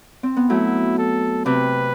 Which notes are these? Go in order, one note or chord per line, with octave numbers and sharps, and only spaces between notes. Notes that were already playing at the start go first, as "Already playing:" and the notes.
C4
B3
F#3 A3 E4
A4
C3 B4